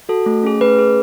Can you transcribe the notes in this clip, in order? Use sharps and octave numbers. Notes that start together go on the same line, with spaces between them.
F#4 A4
A3
C#4 G#4
A3 B4
C#4 G#4